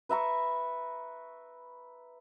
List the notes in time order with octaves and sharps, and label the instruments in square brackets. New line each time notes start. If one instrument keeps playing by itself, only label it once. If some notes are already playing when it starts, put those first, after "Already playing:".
[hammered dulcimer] B4 E5 A#5 C#6